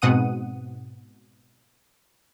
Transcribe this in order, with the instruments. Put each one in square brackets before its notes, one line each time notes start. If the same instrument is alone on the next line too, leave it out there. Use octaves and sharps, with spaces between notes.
[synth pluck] G#2 B2 C4 F#5 D#6 D#7